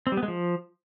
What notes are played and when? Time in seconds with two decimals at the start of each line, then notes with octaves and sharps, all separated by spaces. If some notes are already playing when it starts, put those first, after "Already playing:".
0.07 C4
0.12 G3
0.17 B3
0.23 G#3
0.28 F3